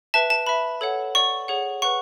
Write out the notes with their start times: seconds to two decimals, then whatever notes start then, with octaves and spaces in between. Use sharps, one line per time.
0.14 B4 E5 A5
0.30 A5
0.47 B4 E5 B5
0.81 A4 C#5 F#5
1.15 A4 D5 F#5 C#6
1.48 G#4 C#5 F#5
1.82 B4 F#5 C#6